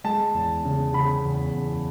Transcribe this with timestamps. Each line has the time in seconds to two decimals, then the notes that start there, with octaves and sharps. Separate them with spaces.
0.04 G#3 A5
0.34 E2
0.65 C#3
0.93 C#3 B5
1.23 E2
1.53 E2